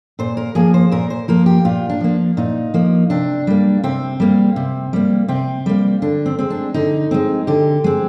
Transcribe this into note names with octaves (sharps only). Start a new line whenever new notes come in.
A#2 C5
A#4
F3 A#3 G#4
C5
A#2 A#4
C5
F3 A#3 A#4
G4
A#2 F4
D4
F3 A#3
A#2 D#4
F3 A#3
C3 D4
G3 A#3
C3 C4
G3 A#3
C3
G3 A#3
C3 C4
G3 A#3
D3 D4
C4
G#3 C4
D4
D3 D#4
G#3 C4
D3 G4
G#3 C4